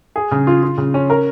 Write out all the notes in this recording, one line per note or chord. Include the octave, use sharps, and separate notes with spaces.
G#4
C#3
F4
F4
C#3
C#4
A#4